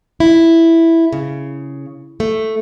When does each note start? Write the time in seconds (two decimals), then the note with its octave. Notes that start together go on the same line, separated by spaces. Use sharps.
0.20 E4
1.13 C#3
2.20 A3